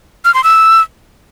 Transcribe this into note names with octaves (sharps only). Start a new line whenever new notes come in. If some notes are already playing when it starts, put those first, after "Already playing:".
F6
C6
E6